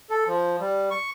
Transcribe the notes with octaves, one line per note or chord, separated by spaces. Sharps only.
A4
F3
G3
C#6